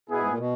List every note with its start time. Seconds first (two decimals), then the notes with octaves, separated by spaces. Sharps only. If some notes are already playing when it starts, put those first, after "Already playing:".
0.09 B2 B3 E4 G#4
0.18 G#2
0.28 A#2
0.38 B2